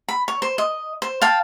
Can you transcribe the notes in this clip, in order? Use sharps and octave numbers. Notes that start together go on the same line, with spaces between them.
B5
C#5
C5
D#5
C5
F5 G5 A5